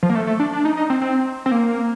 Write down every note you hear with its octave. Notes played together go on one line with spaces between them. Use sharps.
F3
A#3
A3
A3
D4
D4
D#4
D#4
C4
C4
C4
A#3